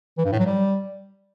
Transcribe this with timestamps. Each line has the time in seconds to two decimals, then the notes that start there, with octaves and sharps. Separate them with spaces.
0.18 E3
0.25 G2
0.32 A2
0.39 F#3
0.46 G3